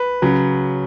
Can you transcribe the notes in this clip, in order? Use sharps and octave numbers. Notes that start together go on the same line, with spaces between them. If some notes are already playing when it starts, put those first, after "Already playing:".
Already playing: B4
C#3 F#3